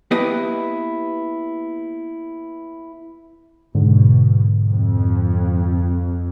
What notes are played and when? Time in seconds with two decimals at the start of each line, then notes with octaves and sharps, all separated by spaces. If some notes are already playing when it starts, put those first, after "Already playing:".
0.11 A#3 B3 E4 G4 B4 D#5
3.75 G#2 B2 D3
4.68 F2